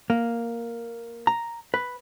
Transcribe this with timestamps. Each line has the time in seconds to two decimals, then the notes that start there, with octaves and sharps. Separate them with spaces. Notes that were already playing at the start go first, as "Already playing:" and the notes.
0.10 A#3
1.27 A#5
1.74 B4